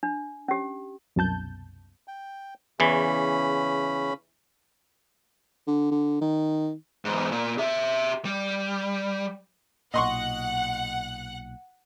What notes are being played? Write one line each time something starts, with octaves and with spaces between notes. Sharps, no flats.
D4
C#4 G4
C2 F#2 B2 A5 G6
G5
E2 C#3 E3 C#4 B5
D3
D3
D#3
E2 G#2
A#2
G4 E5
G3
B1 A#2 D#5 F#5 C6 C#6